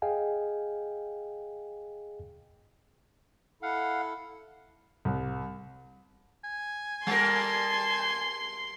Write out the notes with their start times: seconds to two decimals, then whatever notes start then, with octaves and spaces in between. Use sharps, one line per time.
0.02 G#4 D#5 F5 G5 G#5
3.63 E4 A4 F5 F#5
5.05 C2
6.44 G#5
7.07 G3 A#4 A5 C6